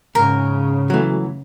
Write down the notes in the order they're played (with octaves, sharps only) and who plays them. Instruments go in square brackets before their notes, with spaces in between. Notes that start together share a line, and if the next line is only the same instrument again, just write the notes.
[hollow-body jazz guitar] C#2 G#2 [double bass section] C#3 [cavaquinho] A#4
[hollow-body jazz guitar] E3 F#3 [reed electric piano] A3 F#4